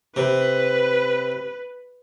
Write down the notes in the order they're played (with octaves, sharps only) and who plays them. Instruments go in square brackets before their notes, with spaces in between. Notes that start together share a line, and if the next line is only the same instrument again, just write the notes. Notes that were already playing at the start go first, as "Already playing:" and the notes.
[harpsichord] C3 [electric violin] B4